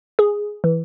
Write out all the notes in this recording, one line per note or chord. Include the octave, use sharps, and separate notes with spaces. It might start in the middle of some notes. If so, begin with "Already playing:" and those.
G#4
E3